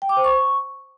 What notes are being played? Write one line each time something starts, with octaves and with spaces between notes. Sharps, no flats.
G5
D6
C5
C#6